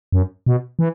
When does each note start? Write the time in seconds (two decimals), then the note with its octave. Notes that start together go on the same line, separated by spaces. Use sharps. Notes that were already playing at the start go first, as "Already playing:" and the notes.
0.12 F#2
0.47 B2
0.79 E3